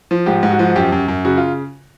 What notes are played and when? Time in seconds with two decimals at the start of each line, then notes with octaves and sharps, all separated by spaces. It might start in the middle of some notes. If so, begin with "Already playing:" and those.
0.11 F3
0.26 G#2 G4
0.43 G#2
0.51 F#4
0.59 F3
0.76 F#2 G4
0.92 F#2
1.08 F#2
1.25 C#3 F#4
1.37 F4